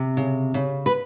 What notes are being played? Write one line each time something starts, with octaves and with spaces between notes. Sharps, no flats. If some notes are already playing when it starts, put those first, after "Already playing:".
Already playing: C3
C#3
C#3
B4